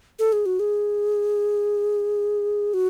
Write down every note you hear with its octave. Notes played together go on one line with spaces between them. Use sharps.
A4
G#4
F#4
G#4
F#4